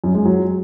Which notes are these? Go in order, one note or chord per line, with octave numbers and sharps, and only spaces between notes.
F#2
G#3
F#3